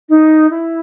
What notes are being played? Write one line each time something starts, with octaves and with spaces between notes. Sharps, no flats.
D#4
E4